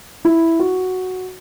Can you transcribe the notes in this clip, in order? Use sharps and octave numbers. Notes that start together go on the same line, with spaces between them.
E4
F#4